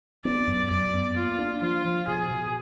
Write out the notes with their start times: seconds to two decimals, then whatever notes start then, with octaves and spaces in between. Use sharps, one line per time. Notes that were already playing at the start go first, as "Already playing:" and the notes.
0.25 B3 D5
0.47 F#2
0.71 F#2 D5
0.93 B3
1.16 A#3 F4
1.39 D4
1.62 F3 F4
1.85 F3
2.08 B2 G#4
2.31 B2